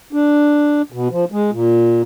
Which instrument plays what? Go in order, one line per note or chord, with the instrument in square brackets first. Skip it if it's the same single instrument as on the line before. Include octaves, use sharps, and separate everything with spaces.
[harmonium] D4
B2
F3
G#3
A#2